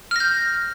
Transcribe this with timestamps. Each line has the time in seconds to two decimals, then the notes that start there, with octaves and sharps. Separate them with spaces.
0.11 F6
0.16 A#6
0.20 G6